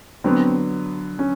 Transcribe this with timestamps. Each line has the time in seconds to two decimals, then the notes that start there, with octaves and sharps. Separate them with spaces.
0.24 D3 F#3 B3 C4
1.19 C#4